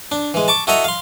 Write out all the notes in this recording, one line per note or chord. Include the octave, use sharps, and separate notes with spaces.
D4
E3 G#3
A5 C#6 D6
E4 F#4 A4 D#5 E5 A#5
F5 C6